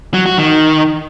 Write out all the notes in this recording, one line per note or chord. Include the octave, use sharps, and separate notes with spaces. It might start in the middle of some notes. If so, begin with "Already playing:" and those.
F#3
F#4
D#3